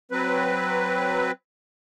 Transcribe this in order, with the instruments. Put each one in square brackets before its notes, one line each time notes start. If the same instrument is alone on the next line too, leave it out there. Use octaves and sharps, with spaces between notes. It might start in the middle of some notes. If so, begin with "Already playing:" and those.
[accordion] F#3 C4 B4